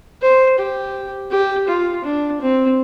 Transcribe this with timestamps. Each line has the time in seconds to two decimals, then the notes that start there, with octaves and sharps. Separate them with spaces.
0.21 C5
0.58 G4
1.31 G4
1.68 F4
2.04 D4
2.41 C4